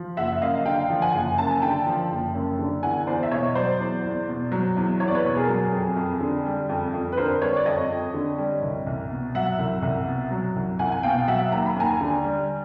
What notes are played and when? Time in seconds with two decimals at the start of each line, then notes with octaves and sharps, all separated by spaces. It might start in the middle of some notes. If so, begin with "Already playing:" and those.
Already playing: F3
0.17 F#1 E5 F#5
0.32 E5
0.42 F#2 D#5 F5
0.65 D3 F5 G5
0.90 F3
1.02 F#5 G#5
1.14 F#1
1.38 F#2 A5
1.51 G#5
1.62 D3 G5 A5
1.86 F3
2.11 F#1
2.35 F#2
2.59 D3
2.83 E2 F#5 G#5
3.07 E2 C5 D5
3.23 E5
3.31 B2 C#5 D#5
3.55 F#3 C5 D5
3.80 E2
4.03 E2
4.28 B2
4.52 F#3
4.77 E2
5.00 E2 C#5
5.08 D5
5.15 B4 C#5
5.25 B2
5.36 G#4 A#4
5.48 F#3
5.72 F2
5.97 F2
6.21 D3
6.45 G3
6.69 F2
6.94 F2
7.12 B4
7.17 D3 A#4 C5
7.41 G3 B4 C#5
7.56 D5
7.65 F2 C#5 D#5
7.90 F2
8.14 D3
8.38 G3
8.62 C2
8.87 C2
9.10 B2
9.35 F#3 E5 F#5
9.59 C2
9.82 C2
10.07 B2
10.31 F#3
10.56 C2
10.79 C2 F#5 G#5
10.92 G#5
11.03 B2 F5 G5
11.28 F#3 E5 F#5
11.52 D#2 A#5
11.66 B5
11.76 D#2 G#5 A#5
12.01 D3
12.24 G3